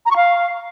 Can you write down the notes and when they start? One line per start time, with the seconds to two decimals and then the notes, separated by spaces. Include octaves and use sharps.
0.06 A#5
0.11 C#6
0.16 F5